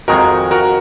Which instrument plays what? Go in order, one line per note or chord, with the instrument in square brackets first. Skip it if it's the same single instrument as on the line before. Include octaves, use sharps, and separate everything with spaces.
[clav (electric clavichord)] F2 D#3 G#3 [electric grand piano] F#4 A#4
[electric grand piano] F#4 A#4